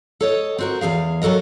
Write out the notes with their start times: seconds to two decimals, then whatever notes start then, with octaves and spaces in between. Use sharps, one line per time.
0.21 A4 C#5 D#5
0.58 C4 F#4 A#4
0.81 E2 C#3 G#4 F5
1.22 F#3 F#4 A4 A#4 D#5